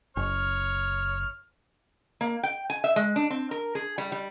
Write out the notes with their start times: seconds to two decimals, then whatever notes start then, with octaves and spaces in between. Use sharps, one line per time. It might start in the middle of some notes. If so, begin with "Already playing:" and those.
0.17 F#1 C#5 F6
2.21 A#3
2.43 G5
2.70 G#5
2.84 E5
2.96 G#3
3.16 D4
3.30 C4
3.51 A#4
3.75 G#4
3.98 G3
4.12 G3